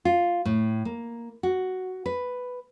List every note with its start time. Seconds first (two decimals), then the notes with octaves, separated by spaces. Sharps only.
0.05 F4
0.45 A2
0.85 A#3
1.43 F#4
2.06 B4